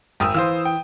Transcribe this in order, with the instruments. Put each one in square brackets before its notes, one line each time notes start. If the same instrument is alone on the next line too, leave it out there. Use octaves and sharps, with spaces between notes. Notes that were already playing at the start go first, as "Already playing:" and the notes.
[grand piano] G#1 [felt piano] G5 D#6 E6
[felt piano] E3 [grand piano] C5 F5 E6
[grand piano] G5